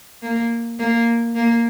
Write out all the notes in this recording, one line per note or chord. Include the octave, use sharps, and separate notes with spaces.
A#3
A#3
A#3